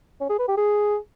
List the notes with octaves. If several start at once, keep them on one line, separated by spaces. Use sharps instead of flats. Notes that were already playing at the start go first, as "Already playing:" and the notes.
C#4
G#4
B4
G4
G#4